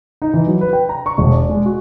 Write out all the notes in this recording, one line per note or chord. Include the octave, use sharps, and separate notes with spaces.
D#4
E3
F#3
B4
G5
A#5
C#6
E1
D5
G#3
F#4